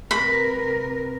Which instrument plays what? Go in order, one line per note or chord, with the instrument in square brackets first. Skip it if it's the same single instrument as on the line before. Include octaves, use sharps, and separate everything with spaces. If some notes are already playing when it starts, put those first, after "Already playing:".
[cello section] C3 A#4 B4 [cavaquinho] B5